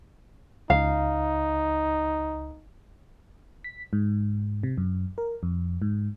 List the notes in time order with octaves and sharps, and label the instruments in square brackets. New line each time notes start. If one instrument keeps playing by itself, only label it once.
[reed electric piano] C#2 [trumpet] D#4 [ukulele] F5
[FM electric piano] B6
G#2
C3
F#2
A#4
F2
G#2